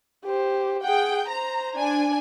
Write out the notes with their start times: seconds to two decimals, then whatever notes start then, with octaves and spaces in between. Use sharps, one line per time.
0.24 G4 C5
0.83 G#4 F#5 G5
1.28 C5 A#5
1.76 D4 G#5